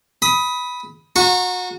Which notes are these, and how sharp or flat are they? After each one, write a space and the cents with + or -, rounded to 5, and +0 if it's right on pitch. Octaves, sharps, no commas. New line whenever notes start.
B5 -5 D#6 +20
F#4 -30 A#5 +0 C#6 -10